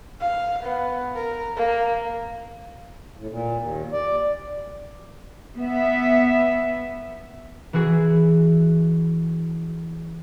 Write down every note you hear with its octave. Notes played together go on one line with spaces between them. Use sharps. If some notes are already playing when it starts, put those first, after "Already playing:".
F5
B3
A#4
A#3
A2
A#2
D#2
D5
B3 E5
E3 E4 F#4 G#4